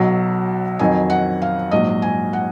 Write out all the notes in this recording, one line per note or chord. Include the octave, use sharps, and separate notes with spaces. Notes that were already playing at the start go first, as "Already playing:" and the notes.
Already playing: B1 B2 F#3
F2 D#3 F#3 G#5
F#5
F5
A#1 G#2 F#3 D#5
G#5
F#5